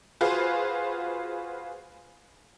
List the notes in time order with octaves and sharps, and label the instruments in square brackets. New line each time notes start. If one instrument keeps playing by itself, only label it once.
[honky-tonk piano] F4 F#4 G#4 B4 C5 F5